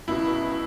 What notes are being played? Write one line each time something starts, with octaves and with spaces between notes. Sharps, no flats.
C#2 B2 E4